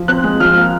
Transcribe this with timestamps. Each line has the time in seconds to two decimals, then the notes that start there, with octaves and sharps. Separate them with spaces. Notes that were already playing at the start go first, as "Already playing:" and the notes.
Already playing: F3
0.08 C4 F#6
0.24 G#3
0.40 F3 F6
0.56 A#3